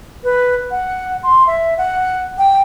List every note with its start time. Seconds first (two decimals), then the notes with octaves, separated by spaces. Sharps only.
0.23 B4
0.71 F#5
1.23 C6
1.47 E5
1.78 F#5
2.38 G5